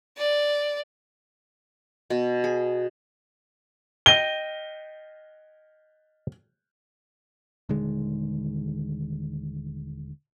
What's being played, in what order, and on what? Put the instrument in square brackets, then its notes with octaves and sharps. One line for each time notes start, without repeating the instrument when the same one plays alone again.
[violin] D5
[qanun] B2
G#4
[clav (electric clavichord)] D#5 G5 [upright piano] G7
[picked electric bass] D#1 D3 D#3 G#3